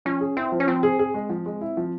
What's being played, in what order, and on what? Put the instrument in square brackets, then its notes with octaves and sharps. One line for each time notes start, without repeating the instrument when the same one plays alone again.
[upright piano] F3 [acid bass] C#4
[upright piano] G#4
[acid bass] C4 [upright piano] E4
[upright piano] F3
[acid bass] C#4
[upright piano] F3 [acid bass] C4
[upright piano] G#4
G#4
G#3
F3
G#3
E4
F3